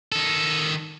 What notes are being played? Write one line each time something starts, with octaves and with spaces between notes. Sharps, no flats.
D#3 A4